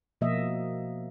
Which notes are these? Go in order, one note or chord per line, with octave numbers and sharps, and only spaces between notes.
B2 F3 A#3 D#5 E5